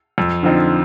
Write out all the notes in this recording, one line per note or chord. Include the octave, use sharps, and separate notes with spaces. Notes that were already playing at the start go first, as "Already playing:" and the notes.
F2
D3 F3 C4 D#4